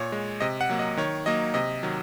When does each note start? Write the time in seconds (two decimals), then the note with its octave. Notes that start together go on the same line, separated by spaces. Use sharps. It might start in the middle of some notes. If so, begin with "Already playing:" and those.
Already playing: A#2 C#5
0.12 G#3
0.41 C3 D#5
0.61 F#5
0.70 F#3 A#3
0.79 D#5
0.97 D#3 C#5
1.26 F#3 A#3 D#5
1.54 C3 D#5
1.83 D#3 F#3